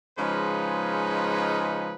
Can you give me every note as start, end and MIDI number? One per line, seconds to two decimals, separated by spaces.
0.18 1.94 49
0.18 1.94 53
0.18 1.94 56
0.18 1.94 61
0.18 1.94 63
0.18 1.94 71